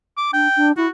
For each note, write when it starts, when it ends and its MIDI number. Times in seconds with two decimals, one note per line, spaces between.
0.17 0.28 86
0.33 0.48 62
0.33 0.68 79
0.56 0.72 62
0.77 0.86 64
0.77 0.89 66